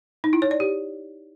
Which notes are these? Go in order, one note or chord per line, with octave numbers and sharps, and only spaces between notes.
D#4
E4
C#5
D5
G4